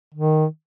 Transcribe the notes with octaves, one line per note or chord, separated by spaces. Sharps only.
D#3